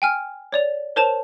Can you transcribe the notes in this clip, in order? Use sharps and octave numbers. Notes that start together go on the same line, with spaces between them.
G5 G#5 F6
C#5 D5 F7
A#4 C5 C#5 A5 E7 F7